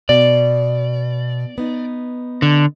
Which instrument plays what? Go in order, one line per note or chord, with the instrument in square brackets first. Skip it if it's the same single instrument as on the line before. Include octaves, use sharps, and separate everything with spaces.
[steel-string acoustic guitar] B2 [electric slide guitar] D5
[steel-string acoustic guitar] B3 D#4
[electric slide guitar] D3